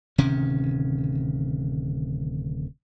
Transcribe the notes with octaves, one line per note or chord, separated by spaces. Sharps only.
D1 C3 D#3 C#4